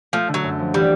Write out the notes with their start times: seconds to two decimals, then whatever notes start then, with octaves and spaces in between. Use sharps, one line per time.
0.13 F3 A3
0.28 D3
0.34 F#3
0.44 F#2
0.59 F3
0.74 E3 G3